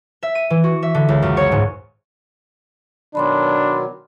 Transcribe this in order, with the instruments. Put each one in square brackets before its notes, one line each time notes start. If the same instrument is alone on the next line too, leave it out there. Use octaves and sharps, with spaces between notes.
[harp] E5
D#7
E3
F#4
E5
D3
C#2
F#2
C#5
G#2
[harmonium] B2 D#3 F#3 [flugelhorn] D4 [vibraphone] B5 C6 D6